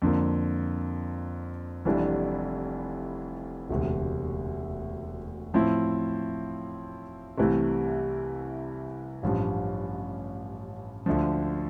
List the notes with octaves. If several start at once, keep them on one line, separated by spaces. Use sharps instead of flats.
F2 D3 F3 A#3
F1 F2 E3 G3 D4
E1 D2 C3
A2 F3 C4 E4
C2 C3 E3 A3
A1 G2 F3
D2 D3 F3